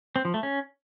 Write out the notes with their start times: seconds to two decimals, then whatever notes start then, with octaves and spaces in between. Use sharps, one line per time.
0.16 C4
0.25 F3
0.34 A3
0.43 C#4